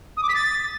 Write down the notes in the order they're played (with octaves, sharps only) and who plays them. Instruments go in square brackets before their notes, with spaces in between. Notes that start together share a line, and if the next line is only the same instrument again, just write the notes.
[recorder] D#6
D6
B6
A6